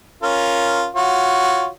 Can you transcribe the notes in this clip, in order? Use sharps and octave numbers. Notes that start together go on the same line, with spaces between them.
C#4 F4 A#4
F4 F#4 C#5